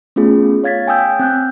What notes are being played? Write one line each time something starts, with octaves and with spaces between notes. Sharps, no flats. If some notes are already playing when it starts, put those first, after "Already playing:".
A3 B3 C#4 F4 G#4
C#5 F5 G#6 A6 B6
G5 G#5 D#6 E6 G6
C4 F#6 G6